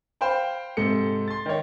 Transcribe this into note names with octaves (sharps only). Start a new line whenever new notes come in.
C5 F5 G5 B5
G#2 C3 A4 C#7
C6 A6
D#3 C#5